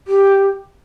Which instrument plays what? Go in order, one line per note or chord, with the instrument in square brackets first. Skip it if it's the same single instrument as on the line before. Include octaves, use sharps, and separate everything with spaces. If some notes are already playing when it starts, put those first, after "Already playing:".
[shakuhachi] G4